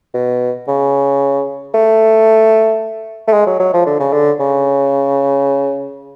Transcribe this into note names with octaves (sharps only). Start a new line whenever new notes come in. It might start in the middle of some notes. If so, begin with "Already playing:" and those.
B2
C#3
A3
A3
G#3
F#3
F#3
F3
D3
C#3
D3
C#3